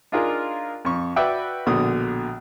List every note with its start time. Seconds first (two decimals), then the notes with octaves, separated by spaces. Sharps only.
0.12 D4 D#4 F4 G#4 A#4
0.85 F2 C#6
1.16 F#4 B4 D5 E5 F#5 G5
1.67 A#1 B2 D3 D#6